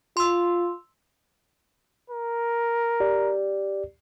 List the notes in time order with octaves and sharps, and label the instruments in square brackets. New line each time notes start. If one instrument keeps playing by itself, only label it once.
[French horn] F4 [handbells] C6 E6
[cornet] A#4
[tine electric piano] G4 D5